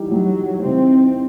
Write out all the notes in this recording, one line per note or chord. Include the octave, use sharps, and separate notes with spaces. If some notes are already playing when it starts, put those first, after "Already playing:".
Already playing: E3 G3 D#4 G4
E3 F#3 G3 D#4 G4
E3 G3 C4 D#4 G4